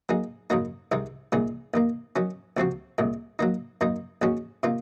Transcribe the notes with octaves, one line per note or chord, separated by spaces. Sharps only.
F#3 A#3 D#4 G#4
F#2 C#3 F#3 A#3 D#4
C2 C3 D#3 G#3 D#4
C2 A#2 G#3 D#4 G#4
D#2 D#3 A#3
D#3 F#3 C#4
C#2 C3 F3 C4 F#4
C2 A#2 G#3
F#3 A#3 D#4
F#2 D#3 A#3 D#4
D#2 D#3 G#3 C#4 F#4
C3 D#3 A#3 F4